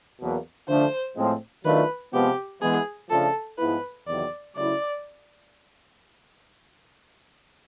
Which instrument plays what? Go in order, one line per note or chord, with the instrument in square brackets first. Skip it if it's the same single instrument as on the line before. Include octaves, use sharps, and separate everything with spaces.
[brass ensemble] E2 B2 F#3 A#3
[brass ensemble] D3 F3 A3 D4 [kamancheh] C5
[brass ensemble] A2 F3 G#3 C4
[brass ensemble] D#3 F#3 A3 D4 F4 [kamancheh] B4
[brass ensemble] C3 F3 G#3 B3 [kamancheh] G4
[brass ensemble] E3 G#3 B3 [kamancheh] G#4
[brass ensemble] C#3 F3 A3 D4 F4 [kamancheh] A4
[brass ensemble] G#2 F3 G#3 B3 E4 [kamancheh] B4
[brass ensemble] E2 C3 D#3 F#3 [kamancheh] D5
[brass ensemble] C#3 F#3 A3 C#4 E4 [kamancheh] D5